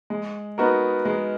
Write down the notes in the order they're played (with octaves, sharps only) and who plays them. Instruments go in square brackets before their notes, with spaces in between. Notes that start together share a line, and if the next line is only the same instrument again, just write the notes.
[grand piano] G#3
B3 D#4 F#4 A#4
G#3